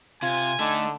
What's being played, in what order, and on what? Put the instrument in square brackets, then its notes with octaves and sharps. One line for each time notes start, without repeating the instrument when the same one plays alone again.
[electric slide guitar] C3 [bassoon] F4 [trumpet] G#5
[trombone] D3 [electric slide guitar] A3 [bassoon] D#4